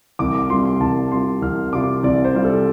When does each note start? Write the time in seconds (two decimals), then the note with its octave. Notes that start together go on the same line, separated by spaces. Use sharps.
0.19 C2 D6
0.34 D6
0.50 C3 G3 F4 C6
0.65 C6
0.80 C2 A5
1.12 C3 G3 F4 C6
1.42 C2 F6
1.73 C3 G3 F4 D6
2.03 C2 D5
2.25 C5
2.34 C3 G3 F4
2.44 A4